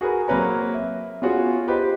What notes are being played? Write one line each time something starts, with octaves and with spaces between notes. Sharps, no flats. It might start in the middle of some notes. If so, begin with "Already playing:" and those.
F#4 G#4 A#4 B4 G#5
F#3 A#3 C4 B4 C#5 A#5
E5
B3 C#4 F4 F#4 G#4 C#5
F4 G4 B4 C5 D#5